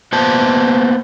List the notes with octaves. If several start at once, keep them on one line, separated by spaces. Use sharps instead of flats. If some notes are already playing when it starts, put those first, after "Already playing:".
A#3 B3 C5 A5